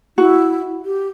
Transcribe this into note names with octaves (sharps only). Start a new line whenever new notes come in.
E4 F#4
G4